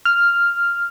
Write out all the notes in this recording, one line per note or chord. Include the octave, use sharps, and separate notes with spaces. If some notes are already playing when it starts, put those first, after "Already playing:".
F6